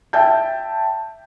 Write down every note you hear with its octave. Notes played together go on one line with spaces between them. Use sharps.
E5 G5 A5 G6